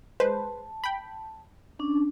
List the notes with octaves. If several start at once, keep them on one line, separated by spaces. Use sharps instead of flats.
G#3 B4 C5 A5
G5 B5
C#4 D4